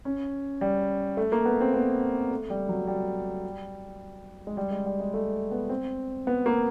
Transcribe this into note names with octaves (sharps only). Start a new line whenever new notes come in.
C#4
G3
A3
A#3
B3
C4
B3
A3
G3
F#3
G3
G#3
G3
G#3
G3
G#3
A3
B3
C4
B3
A#3